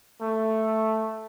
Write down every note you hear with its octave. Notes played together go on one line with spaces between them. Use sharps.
A3